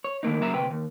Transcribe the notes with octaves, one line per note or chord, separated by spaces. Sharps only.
C#5
D#3 A3 A#3 D#4
B1 C#3 F#3 A#3 E5 A#5
D2 C3 B4 G5
D#2